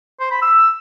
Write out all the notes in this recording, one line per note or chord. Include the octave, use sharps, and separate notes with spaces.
C5
B5
E6